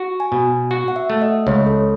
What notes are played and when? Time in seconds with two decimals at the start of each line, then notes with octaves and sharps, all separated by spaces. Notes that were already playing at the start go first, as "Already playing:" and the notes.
Already playing: F#4
0.20 G#5
0.32 B2
0.71 F#4 F#5
0.88 F#5
0.96 E5
1.10 A3
1.22 D#5
1.47 C#2 C#5
1.67 A4